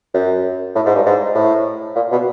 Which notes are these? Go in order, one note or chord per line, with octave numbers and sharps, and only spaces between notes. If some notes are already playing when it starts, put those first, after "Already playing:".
F#2
A2
G#2
G2
G#2
A2
A#2
B2